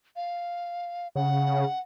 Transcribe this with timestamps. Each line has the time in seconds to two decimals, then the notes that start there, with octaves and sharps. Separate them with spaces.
0.16 F5
1.16 C#3 F#5